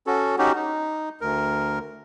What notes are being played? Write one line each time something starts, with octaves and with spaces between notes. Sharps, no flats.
C#4 F#4 A4
C#4 D#4 F#4 G4
D#4
D2 A#4